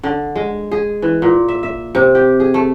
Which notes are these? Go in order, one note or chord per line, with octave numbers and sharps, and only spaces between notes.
D3
G#3
G#4
E3
A#2
E5
E5
C3
G4
G#4
A3